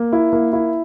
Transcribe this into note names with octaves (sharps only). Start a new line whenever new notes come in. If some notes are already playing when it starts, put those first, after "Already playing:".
Already playing: A#3
E4
A#3
E4